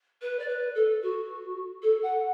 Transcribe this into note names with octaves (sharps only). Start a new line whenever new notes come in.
B4
D5
B4
A4
F#4
A4
F#5